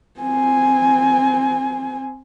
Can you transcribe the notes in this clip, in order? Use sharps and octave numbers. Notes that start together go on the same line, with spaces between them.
C4 G#5